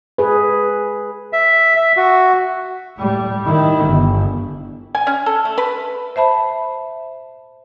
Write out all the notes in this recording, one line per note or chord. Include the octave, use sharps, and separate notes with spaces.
G#4 B4
E5
E5
F#4
A2 G3
D#3 E4
G1
G#5
C#4
A4
A3
B4
C5 E5 A5 B5